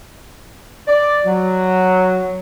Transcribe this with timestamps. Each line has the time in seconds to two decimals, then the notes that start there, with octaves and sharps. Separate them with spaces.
0.87 D5
1.26 F#3